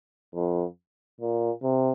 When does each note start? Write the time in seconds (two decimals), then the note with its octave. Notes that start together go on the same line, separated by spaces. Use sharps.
0.34 F2
1.21 A#2
1.63 C3